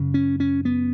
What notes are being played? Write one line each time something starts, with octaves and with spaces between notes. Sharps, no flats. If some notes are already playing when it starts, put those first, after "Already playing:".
Already playing: F#2 C#3
C#4
C#4
B3